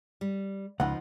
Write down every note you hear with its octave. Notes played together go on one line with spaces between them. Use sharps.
G3
C#2 F3 D#4 F#5